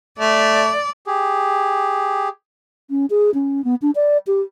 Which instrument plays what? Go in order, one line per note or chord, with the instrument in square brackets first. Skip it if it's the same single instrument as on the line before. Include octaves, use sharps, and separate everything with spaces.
[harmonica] A3 [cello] D5
[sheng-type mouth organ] G4 G#4
[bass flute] C#4
G#4
C#4
B3
D4
D5
G4